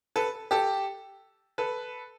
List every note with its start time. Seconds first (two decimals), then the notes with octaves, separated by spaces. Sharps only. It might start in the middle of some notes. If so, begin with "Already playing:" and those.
0.16 A4 B4
0.51 G4 A4
1.58 A4 B4